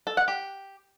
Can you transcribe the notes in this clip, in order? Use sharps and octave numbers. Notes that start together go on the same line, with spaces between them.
A4
F#5
G4